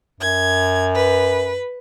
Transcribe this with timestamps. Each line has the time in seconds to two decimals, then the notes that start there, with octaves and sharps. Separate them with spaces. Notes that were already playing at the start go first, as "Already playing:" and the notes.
0.20 F#2 G#6
0.94 B4